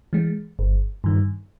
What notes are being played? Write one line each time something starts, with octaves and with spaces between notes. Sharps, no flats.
E3 G#3
G1
G2 D#3